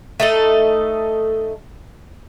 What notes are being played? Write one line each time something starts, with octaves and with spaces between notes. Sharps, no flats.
A3 D#4 A4